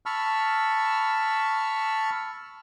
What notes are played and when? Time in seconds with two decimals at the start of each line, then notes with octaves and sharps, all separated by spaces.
0.06 A5 B5 C#6 E6 F6